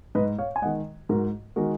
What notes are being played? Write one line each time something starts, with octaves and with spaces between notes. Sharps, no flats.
G#2 B4 D#5
C#5 F5
G#5
D#3 G#3 D#5 F#5
G#2 F#4 A#4
D#3 G#3 F#4 A#4